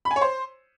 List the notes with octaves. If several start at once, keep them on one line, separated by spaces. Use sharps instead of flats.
B5
G#5
C#5
C5